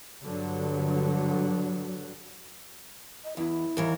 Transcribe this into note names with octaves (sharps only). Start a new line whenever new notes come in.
G2 D3 F#3
D#5
E2 E4
D#2 E3 A#4